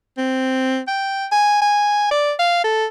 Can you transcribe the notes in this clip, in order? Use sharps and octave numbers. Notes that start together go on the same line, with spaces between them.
C4
G5
G#5
G#5
D5
F5
A4